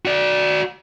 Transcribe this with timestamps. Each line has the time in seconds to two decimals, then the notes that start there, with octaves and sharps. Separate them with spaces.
0.05 F#4 D5